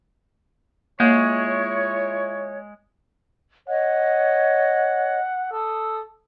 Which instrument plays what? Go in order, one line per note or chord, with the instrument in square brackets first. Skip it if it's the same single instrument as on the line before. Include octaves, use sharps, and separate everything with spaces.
[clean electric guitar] G#3 [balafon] A#3 [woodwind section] E4 F4 C#5
[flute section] C#5 D#5 [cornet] F#5
[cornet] A4 [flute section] D#6 E6